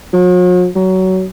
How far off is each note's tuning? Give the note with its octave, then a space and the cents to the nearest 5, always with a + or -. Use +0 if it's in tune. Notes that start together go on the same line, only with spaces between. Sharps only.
F#3 -45
F#3 +20